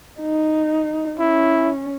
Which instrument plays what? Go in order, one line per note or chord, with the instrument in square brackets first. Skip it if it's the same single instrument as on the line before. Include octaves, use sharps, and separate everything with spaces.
[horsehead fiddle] D#4
[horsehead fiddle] C#4 [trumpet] E4